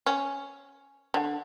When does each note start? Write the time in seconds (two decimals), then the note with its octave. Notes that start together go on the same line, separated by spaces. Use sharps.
0.06 C#4
1.14 D3